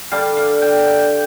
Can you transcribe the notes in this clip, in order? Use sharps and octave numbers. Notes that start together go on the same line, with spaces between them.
D3 G3 D4 F5
F5
G5
G5